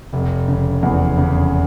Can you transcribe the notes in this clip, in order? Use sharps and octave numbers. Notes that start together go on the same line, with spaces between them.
F1
C#3
E2
C#3